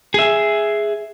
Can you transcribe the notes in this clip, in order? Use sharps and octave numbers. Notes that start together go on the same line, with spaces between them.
G#4 E5